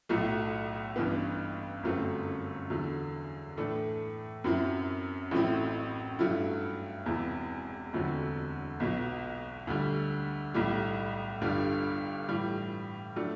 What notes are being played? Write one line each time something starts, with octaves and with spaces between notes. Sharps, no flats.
B1 A2 F#3 A3
A1 G2 E3 B3
G1 F#2 F#3 A3 C4
E2 D3 F#3
A2 E3 A3 D4
F#2 F#3 C4 E4
A1 A2 F#3 C4 E4
G2 F#3 A3 E4
E1 E2 C3 E3
E1 D2 D3 F#3 C4
B1 B2 F#3
D2 D3 G3
B1 A2 G3
G1 G2 D3 G3 D4
A2 E3 G3
F#3 A3 D4